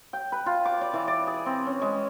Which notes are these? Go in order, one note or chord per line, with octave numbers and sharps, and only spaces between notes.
G5
B4
F4
D6
D5
E3
D5
G#4
C4
C#4
G#3